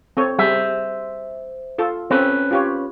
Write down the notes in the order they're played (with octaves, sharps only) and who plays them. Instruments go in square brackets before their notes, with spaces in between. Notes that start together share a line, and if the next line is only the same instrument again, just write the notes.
[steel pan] C4 A4 C#5
[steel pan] G3 G#4 [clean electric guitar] C5 E5
[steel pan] F4 A4
[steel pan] C4 A4 [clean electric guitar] C#4 B4
[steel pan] F4 G4 C#5